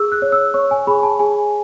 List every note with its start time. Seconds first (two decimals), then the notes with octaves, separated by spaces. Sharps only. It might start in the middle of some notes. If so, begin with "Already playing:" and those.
Already playing: G#4 E6
0.12 F#6
0.22 C#5
0.32 E6
0.54 C#5 C#6
0.71 G#5
0.87 G#4 B5
1.03 A5
1.19 G#4 G#5